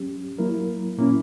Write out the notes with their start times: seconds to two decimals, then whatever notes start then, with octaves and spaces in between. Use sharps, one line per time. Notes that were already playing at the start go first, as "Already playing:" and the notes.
Already playing: F#3 C#4 G4
0.39 F#3 A#3 E4 A#4
0.98 A#2 A#3 C#4 E4